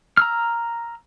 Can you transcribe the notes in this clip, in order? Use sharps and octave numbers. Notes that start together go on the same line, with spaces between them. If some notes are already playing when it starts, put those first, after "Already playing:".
A#5 E6 F6